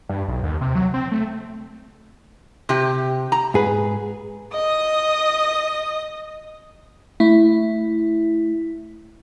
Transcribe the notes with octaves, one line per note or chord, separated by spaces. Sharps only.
G2
B1
D#2
C3
F#3
C4
A3
C3 G4
A#5
G#2 G#4 B4
D#5 D#6
A3 E4